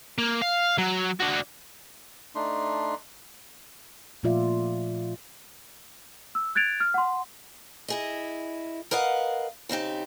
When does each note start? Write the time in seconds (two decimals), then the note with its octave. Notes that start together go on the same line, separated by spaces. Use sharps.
0.18 A#3
0.42 F5
0.78 F#3
1.20 D4 F#4
2.35 A3 D4 D#4 C6
4.23 A#2 F3 A3 F4 D5 E5
6.35 E6
6.55 F#6 G#6 A6 D7 F7
6.80 F6
6.94 F#5 C6
7.88 E4 G#4 D#5
8.91 A#4 B4 D#5 F5 F#5
9.69 C#3 C4 D#4 G4